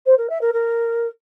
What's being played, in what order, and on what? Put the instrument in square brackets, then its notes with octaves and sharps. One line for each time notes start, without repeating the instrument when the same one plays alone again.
[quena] C5
A#4
E5
A#4
A#4